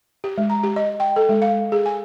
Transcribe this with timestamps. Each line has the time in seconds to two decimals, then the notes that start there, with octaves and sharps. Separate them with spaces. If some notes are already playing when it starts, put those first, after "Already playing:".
0.24 G4
0.38 G#3
0.50 A#5
0.64 G4
0.76 D#5
1.00 G5
1.16 A4
1.29 G#3
1.42 F5
1.72 G#4
1.86 G#5